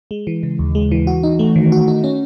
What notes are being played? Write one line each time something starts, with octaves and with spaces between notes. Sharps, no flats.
G#3
E3
C#3
D#2
G#3
E3
F#4
D#4
A3
D#3
F#4
D#4
C#4